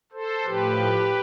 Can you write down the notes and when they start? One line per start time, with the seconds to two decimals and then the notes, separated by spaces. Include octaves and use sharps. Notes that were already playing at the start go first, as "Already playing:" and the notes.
0.12 A4 C5
0.44 A2 F3 G4 B4